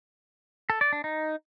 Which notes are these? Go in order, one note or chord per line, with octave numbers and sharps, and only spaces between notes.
A4
D5
D4
D#4